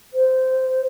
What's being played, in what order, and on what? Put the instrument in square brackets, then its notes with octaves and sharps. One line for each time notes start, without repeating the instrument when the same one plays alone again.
[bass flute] C5